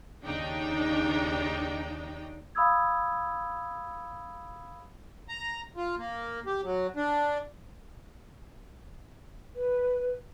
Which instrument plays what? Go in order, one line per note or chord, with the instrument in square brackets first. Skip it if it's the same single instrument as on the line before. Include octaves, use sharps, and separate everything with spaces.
[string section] D#2 C#3 D4 D#4 D#5 G5
[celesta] F5 B5 D#6 E6 G#6
[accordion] A#5
F4
A#3
G4
F#3
D4
[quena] B4